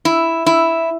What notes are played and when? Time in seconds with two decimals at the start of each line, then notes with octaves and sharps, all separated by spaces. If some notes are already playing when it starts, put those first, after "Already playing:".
0.05 E4
0.46 E4